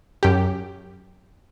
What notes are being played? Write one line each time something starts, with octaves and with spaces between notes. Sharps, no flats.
F#2 G4